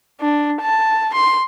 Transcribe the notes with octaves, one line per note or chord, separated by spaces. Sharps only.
D4
A5
C6